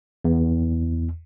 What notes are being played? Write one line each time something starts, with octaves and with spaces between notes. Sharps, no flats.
E2